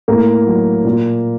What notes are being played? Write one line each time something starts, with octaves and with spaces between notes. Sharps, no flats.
A2 A#3
F#3
A#2